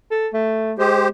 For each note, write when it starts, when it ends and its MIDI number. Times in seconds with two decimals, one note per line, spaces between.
0.11 0.28 69
0.33 0.73 57
0.79 1.08 56
0.79 1.08 67
0.79 1.08 72